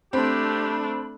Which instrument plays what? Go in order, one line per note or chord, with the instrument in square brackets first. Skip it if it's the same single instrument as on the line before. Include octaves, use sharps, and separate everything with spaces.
[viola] A3 D4 [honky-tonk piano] C4 [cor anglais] G4 [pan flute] B5